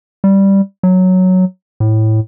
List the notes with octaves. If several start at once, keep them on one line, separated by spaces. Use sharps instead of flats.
G3
F#3
A2